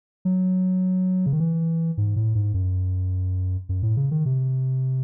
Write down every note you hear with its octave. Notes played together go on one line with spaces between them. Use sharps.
F#3
C#3
D#3
E3
G#2
A2
G#2
F#2
F#2
A2
C#3
D#3
C3